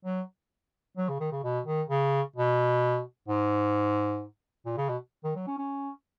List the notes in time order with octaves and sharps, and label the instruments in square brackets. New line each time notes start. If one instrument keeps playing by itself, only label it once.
[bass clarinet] F#3
F#3
C#3
D#3
C#3
B2
D#3
C#3
B2
G#2
A#2
C#3
B2
D#3
F#3
C#4
C#4